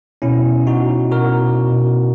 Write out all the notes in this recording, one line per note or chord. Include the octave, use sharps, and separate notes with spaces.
B2 C#4 E4
B2
D#4 F#4
B2
B2 F#4 A#4
B2
B2